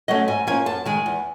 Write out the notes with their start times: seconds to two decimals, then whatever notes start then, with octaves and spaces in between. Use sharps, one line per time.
0.08 F#3 A3 C#4 D#5
0.28 G#2 G#5
0.47 F3 A#3 C#4 F4 G#5
0.66 F#2 A5
0.85 D#3 G#3 G#5
1.06 E2